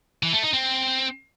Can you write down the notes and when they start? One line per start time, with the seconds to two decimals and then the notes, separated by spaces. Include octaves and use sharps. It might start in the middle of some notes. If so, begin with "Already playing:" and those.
0.23 E3
0.33 A3
0.43 D#4
0.53 C4